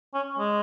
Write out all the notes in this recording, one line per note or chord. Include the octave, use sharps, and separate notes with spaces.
C#4
G#3